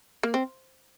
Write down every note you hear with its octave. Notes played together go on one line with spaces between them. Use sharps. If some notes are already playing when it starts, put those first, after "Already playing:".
A#3
C4